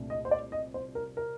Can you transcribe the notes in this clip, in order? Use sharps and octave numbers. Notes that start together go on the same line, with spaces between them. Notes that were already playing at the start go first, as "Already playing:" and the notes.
Already playing: C2 A#2 A3 D4
D#5
C5
D5
D#5
C5
A#4
A#4